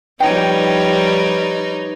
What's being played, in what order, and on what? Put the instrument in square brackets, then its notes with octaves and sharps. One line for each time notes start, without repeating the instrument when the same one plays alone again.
[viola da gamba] F3 G3 [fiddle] D#4 [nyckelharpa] B4 C#5 [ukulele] G5